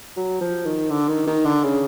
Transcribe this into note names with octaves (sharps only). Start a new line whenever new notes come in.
F#3
F3
D#3
D3
D#3
D#3
D3
C#3